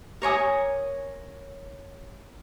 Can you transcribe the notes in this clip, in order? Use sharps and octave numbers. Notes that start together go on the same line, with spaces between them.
A#4 C#5 G#5 D#6